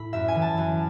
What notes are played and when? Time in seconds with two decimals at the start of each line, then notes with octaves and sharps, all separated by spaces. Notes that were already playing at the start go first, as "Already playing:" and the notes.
Already playing: A2 B5 E6
0.13 F#2 E5
0.28 G#5
0.35 E3
0.42 A5
0.57 F#2